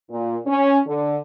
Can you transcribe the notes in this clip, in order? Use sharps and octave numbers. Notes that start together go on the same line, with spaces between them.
A#2
C#4
D3